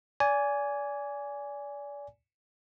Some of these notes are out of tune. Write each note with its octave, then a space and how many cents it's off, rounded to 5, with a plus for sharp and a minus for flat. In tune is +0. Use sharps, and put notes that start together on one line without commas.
D5 -30 G#5 +0